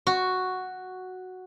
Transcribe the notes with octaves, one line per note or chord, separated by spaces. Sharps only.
F#4